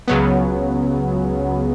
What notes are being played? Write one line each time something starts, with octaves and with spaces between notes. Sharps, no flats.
C#2 C#3 F#3 B3